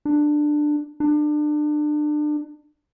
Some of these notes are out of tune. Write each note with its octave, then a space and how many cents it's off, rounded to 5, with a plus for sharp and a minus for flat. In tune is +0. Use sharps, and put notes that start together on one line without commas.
D4 +15
D4 +30